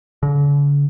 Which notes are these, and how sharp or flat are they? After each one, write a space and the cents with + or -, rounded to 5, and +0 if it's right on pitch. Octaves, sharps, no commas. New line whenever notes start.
D3 -45